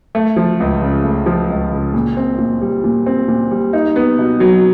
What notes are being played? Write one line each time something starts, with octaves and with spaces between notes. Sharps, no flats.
A3
F3
C#2
C#3
A3
F3
C#2
C#3
A#2
C4
A#2
G3
A#2
C4
A#2
G3
D#4
B3
B2
F#3